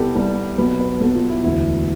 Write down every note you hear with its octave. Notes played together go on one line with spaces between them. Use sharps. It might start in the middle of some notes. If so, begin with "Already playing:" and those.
Already playing: C2 C3 G3 B3 G4 A4
C2 C3 G3 B3
B1 B2 B3 B4
B4
B1 B2 B3 A4
F4
E4
E1 D2 D3 E4